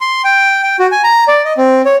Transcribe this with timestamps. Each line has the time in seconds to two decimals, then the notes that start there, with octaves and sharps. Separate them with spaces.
0.01 C6
0.24 G5
0.63 G5
0.79 F#4
0.92 G#5
1.04 A#5
1.28 D5
1.45 D#5
1.57 C4
1.86 C#5